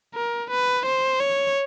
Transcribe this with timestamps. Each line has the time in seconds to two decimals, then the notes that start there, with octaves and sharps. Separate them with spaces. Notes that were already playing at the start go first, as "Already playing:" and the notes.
0.15 A#4
0.50 B4
0.85 C5
1.20 C#5